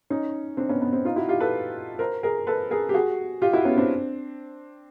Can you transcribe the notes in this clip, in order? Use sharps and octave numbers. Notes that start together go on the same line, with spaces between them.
C#4 D#4
C4 D4
B3 C#4
B3
C4
D#4 F4
E4 F#4
F4 G4
A4 B4
A#4 C5
G#4 A#4
A4 B4
G#4 A#4
G4
F#4 G#4
F4 G4
E4 F#4
B3 C#4
C4 D4